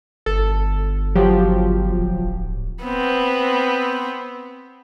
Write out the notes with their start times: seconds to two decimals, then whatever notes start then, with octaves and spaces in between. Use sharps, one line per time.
0.26 G1 A4
1.16 F3 F#3 G4
1.98 D1
2.84 B3 C4